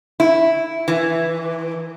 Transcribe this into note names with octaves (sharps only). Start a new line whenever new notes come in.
E4
E3